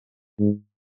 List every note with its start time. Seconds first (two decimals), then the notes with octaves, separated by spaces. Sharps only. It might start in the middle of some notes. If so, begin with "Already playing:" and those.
0.39 G#2